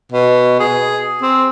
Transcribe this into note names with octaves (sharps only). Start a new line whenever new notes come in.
B2
G#4
C4